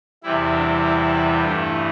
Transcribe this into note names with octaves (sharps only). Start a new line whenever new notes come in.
E2 C3 E3 G3 E4
D4
E4
E4
G2 E3 A3 D4 F4